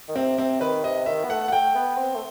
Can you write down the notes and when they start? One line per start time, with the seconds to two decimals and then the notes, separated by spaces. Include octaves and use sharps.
0.09 D#3
0.16 C3 C4
0.38 C4
0.61 D#3 B4
0.84 C3 D#5
1.06 D#3 E5
1.24 B3
1.30 A3 F#5
1.48 F#5
1.52 A3 G5
1.75 B3
1.97 C4
2.15 A3